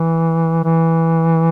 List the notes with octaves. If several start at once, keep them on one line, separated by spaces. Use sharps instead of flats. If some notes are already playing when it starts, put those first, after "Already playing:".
Already playing: E3
E3